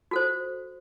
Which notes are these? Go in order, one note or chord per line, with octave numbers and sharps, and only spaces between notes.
F#4 A4 C5